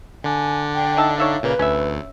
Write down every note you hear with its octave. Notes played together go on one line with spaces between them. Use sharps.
D3 D4 G#5
G5
D#4 E5 A5
D#4 C#5 E5 F5
A#2 C#3 A#3 B4
D2 C#4 E5